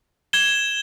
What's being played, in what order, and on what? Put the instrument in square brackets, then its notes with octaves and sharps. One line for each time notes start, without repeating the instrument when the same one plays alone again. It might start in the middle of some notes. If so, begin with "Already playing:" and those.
[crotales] G#6 E7 G7